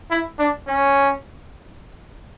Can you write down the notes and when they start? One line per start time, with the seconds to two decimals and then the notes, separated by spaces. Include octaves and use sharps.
0.11 E4
0.39 D4
0.67 C#4